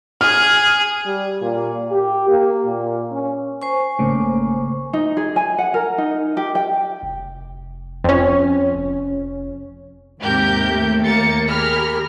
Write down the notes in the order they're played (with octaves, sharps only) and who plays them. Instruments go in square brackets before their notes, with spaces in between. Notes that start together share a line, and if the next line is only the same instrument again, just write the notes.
[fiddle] G#4 [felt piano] F6
[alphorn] G3
A#2
G4
A#3
A#2
C#4
[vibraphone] C5 G#5 C#6
[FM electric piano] G#1 C#3 [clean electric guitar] A3 A#3
[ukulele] D#4
G#4
G#5
F#5
A#4
D#4
G4
G5
[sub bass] F1
[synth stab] F2 C#4
[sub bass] F1
[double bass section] D#2 [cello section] G#2 C3 [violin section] G4 A#4 G6
[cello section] A3
[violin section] A#3 A6 C#7
[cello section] G4 G#4 A#4 [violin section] B5 F6